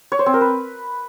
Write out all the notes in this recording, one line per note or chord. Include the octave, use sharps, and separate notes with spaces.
C#5
C5
C4
A#4
B4